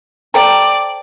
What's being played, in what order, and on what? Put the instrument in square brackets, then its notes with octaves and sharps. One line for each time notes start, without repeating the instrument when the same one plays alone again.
[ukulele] A4 C5 G5 A#5 [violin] D5